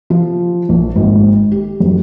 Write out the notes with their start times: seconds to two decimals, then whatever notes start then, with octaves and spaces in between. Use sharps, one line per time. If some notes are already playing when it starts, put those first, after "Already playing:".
0.10 F3
0.69 A#1
0.96 G#1
1.52 G4
1.80 F#1